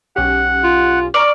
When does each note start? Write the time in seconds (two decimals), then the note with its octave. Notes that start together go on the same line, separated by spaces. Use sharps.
0.16 B1 C#4 G4 F#5
0.64 F4
1.14 D5 A#5 C#6 F6